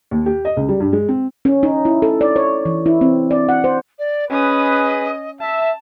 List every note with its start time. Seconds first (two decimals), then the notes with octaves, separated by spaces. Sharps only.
0.11 D#2
0.26 G4
0.45 D#5
0.57 C#2
0.69 G3
0.80 G2
0.93 G#3
1.08 C4
1.45 C#4
1.63 D#4
1.85 E4
2.02 A4
2.21 D5
2.36 C#5
2.66 E3
2.86 E4
3.01 C4
3.31 D5
3.49 F#5
3.64 C5
3.99 D5
4.30 C#4 G#4 B4 D#5 D#6
5.41 E5 A5